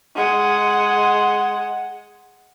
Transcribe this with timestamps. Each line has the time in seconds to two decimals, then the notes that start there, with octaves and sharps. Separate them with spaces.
0.15 G#3 F#5